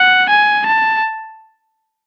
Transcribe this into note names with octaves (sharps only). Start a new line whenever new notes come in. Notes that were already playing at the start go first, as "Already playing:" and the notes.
Already playing: F#5
G#5
A5